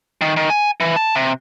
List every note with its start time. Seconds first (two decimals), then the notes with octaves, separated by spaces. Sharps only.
0.21 D#3
0.36 D#3
0.50 G#5
0.80 E3
0.96 A5
1.15 C3